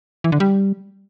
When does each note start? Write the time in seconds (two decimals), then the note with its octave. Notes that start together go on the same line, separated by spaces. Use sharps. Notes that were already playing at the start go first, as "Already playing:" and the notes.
0.24 E3
0.32 D3
0.40 G3